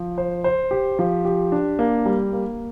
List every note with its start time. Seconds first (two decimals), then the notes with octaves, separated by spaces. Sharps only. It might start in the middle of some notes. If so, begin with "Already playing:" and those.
Already playing: F3
0.18 C5
0.44 C5
0.71 G4
0.99 F3
1.25 G4
1.52 D4
1.79 A#3
2.06 G3
2.33 A#3